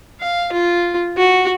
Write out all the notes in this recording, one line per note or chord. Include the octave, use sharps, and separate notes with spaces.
F5
F4
F#4